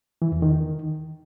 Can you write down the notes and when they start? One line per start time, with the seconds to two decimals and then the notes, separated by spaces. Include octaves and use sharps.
0.22 E3
0.32 E2
0.42 D#3